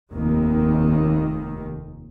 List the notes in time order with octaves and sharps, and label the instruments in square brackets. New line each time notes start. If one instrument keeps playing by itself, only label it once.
[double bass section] F1 D#2 D#3